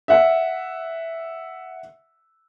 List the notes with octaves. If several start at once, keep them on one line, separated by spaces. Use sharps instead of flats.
E5 F#5